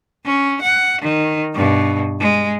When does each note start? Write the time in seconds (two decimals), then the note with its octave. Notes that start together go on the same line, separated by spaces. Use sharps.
0.25 C#4
0.62 F#5
1.02 D#3
1.54 G2 B2
2.20 G#3